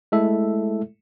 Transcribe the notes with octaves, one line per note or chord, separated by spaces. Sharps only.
G#3 A3 E4 A4 E5